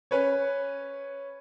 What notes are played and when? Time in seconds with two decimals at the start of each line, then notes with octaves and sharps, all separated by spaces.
0.11 C#4 B4 C#5